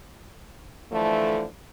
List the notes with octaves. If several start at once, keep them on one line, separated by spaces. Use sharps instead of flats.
D3 E3 F3 A3